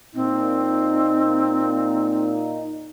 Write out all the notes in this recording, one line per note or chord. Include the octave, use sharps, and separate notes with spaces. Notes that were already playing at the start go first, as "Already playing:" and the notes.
A#2 C4 D#4